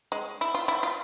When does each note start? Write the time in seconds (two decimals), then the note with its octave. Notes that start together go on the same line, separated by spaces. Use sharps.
0.12 G#3
0.41 E4
0.54 F4
0.68 E4
0.83 F4